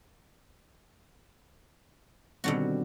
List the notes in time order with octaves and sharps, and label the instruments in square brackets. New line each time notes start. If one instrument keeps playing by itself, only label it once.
[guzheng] B2 D3 F#4 [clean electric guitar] D#3 G3 C4